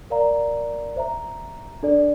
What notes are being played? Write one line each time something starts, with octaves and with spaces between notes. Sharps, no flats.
A#4 D5 F5 A#5
C5 E5 A#5
D4 A4 D5